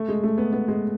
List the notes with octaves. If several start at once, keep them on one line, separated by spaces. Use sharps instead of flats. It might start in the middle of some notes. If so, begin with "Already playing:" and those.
Already playing: A3
G#3
A3
B3
B3
G#3